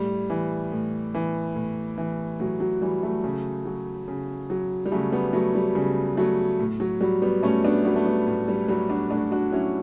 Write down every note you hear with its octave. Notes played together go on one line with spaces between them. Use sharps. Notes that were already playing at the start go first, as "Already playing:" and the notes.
Already playing: A2 G3
E3
A2
E3
A2
E3
A2 F#3
F#3
E3 G3
F#3 A3
C#3
F#3
C#3
F#3
G3
C#3 F#3 A3
G3 B3
F#3 A3
G3
C#3 G3
F#3 A3
A2
F#3
F#3 G3
G3 B3
A2 A3 C#4
B3 D4
F#3 G3 B3
A3
G3 B3
A2
G3
F#3 G3
D4 F#4
A2 D4 F#4
D4 F#4
F#3 C#4 E4